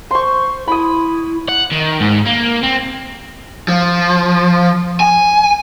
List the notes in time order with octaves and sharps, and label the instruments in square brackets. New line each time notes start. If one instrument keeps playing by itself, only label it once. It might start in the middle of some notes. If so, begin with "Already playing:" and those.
[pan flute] C5 [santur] C6 C#6
[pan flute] E4 [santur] B5 D#6
[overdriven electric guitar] F#5
D#3
G#2
A#3
C4
[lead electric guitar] F3
G#5